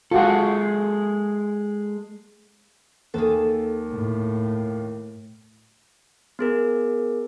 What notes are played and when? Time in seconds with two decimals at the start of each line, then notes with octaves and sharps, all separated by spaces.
0.11 G#3 F4 F#4 A4
3.14 D#2 G#4 A4
3.91 A2
6.39 B3 G#4 A#4